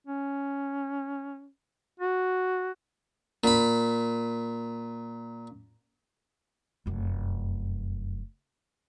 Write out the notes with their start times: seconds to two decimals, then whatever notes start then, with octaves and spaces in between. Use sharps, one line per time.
0.07 C#4
2.00 F#4
3.44 A#2 B5
6.86 F1 F#2